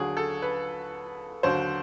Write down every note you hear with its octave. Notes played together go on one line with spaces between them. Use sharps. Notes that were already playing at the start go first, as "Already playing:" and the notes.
Already playing: D#2 D3 F#3 G#4
A4
B4
D#2 D3 F#3 C5